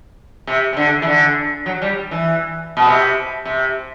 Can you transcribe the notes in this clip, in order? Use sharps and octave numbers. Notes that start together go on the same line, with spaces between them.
C3
C3
D3
E3
D3
F#3
G3
E3
B2
C3
C3